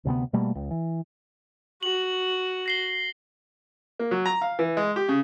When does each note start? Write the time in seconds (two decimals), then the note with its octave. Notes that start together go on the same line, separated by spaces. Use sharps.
0.05 D2 C3 A#3 B3
0.33 B2 G3 A3 A#3
0.55 C#2
0.71 E3
1.83 F#4 F#7
2.66 A#6 C7 G7
3.99 A#3
4.11 F#3
4.26 A#5
4.42 F5
4.59 E3
4.77 G#3
4.96 G4
5.08 C#3